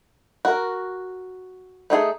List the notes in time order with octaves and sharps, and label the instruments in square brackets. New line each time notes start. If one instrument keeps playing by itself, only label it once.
[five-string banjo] F#4 A#4
A3 D#4 G#4 A4